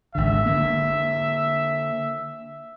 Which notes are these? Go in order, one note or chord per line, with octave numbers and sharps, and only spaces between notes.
G#1 D3 E5
D3 A#3